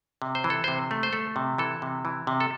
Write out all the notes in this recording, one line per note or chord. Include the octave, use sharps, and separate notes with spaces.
C3
C5
E3
A4
C3 C5
A3
C5
A3 A4
C3
E3 A4
C3
E3
C3
A4